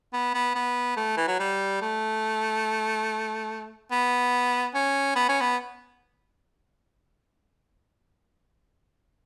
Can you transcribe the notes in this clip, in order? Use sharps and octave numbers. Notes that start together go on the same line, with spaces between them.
B3
B3
B3
A3
E3
F#3
G3
A3
B3
C#4
B3
C#4
B3